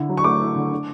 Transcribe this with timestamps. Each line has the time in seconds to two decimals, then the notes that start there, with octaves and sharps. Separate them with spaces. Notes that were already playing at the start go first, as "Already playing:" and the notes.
Already playing: D3 E4
0.09 F#3
0.17 C#6
0.24 A3 D6
0.41 E4
0.56 D3
0.72 D4